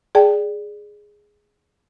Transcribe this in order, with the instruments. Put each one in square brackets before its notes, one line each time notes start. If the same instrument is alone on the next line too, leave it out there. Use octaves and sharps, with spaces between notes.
[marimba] G#4 D5 G5 A5